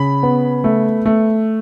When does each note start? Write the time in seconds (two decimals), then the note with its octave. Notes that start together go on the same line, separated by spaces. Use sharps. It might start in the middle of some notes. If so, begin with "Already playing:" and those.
Already playing: C#3 B5
0.23 B3
0.64 A3
1.06 A3